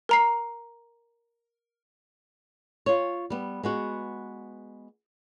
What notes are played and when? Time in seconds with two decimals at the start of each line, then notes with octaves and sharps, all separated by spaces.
0.09 A#4 A#5 C7
2.86 F4 C#5
3.30 G3 B3
3.63 G#3 B3 F#4